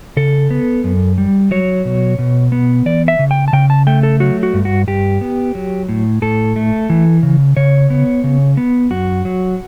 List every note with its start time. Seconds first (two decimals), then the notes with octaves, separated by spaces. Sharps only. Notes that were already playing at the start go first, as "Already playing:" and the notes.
0.17 C#3 A4
0.51 B3
0.84 F#2
1.18 G3
1.51 F#3 C#5
1.85 B2
2.19 B2
2.52 B3
2.86 E3 D5
3.08 E5
3.19 C#3
3.31 G5
3.48 A5
3.53 C#3 G5
3.70 A5
3.87 A3 G5
4.03 A4
4.20 F#3 F#4
4.43 F#4
4.54 G2
4.65 F#4
4.87 G2 G4
5.21 B3
5.55 F#3
5.89 A2
6.22 A2 A4
6.56 A3
6.90 E3
7.23 C#3
7.57 C#3 C#5
7.90 B3
8.24 C#3
8.57 B3
8.91 F#2 F#4
9.25 F#3